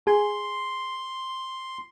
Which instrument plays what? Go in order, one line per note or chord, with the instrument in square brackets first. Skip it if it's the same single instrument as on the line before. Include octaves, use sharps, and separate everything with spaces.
[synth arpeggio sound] G#4 G#5 [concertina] C6